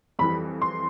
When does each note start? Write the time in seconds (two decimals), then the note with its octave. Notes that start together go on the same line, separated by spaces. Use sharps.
0.19 F2 E3 G3 B5
0.62 C6